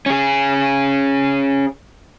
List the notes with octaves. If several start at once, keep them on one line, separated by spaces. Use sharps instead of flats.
C#4 G#4